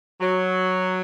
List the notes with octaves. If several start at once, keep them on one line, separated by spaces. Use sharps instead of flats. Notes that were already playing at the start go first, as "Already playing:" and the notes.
F#3